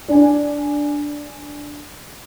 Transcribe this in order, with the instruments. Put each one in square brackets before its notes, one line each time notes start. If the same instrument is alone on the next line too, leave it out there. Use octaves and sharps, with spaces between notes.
[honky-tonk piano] D4 G#5